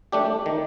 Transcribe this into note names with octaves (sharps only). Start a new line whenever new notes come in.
A3 D4 G4
D#3